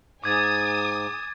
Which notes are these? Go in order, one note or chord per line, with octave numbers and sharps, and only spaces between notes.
G#2 G#5 D6 D#6 G#6 A6